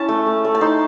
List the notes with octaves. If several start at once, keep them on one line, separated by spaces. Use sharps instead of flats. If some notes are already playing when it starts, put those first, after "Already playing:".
Already playing: C#4 E4 A5
A3
A3
A3
A5
D#4 C6